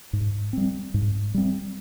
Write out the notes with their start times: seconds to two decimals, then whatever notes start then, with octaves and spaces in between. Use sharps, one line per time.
0.13 G#2
0.53 G3 C4
0.94 G#2
1.34 G3 C4